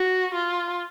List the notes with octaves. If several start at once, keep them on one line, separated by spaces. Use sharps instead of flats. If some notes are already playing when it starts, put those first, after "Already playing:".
Already playing: F#4
F4